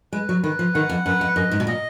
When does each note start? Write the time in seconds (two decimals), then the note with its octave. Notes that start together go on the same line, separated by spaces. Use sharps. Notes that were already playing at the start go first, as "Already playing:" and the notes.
0.13 G#3 B4
0.29 F#3
0.43 D#3 B4
0.59 F3
0.74 D#3 F#5
0.89 F2
1.06 F#2 B4
1.21 F2
1.36 F#2 D#5
1.51 G#2
1.60 B2
1.67 A#2 D#5